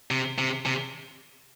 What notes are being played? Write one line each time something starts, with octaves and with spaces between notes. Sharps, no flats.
C3
C3
C3